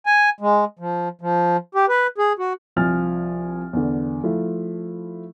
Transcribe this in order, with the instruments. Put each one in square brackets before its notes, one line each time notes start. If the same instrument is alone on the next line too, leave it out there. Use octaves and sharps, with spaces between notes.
[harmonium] G#5
G#3
F3
F3
G4
B4
G#4
F#4
[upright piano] C2 F3 G#5 F6 A6
E2 D3
F3 A3 E4 F4